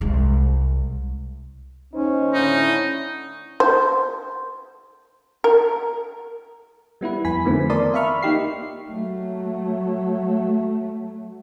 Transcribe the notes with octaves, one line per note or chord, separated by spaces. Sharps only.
C2 G#3
D#2 C#4 D#4 C5
A2 D3 D#4 E4
C5
A#4
G3 B3 E4 B4
F2 G#5 B5 B6
D3 D#3 F3 A3 B3 C4
A#4 D5 A5 C6 D#6
E5 F5 B5 C#6 F6
A#3 D#4 G4 C7
F#3 A3